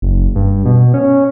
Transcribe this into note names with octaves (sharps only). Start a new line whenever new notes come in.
F#1
G2
B2
C#4